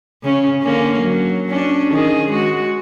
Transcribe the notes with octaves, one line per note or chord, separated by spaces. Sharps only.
C#3 C#4
D3 A#3 C#4
F#3
C#4 D4
D#3 G#4
G#3 F#4